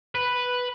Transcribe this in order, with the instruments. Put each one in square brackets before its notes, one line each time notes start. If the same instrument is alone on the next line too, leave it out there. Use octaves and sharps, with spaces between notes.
[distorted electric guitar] B4